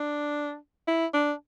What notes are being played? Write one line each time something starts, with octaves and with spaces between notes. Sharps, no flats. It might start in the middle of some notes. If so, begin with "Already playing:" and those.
Already playing: D4
E4
D4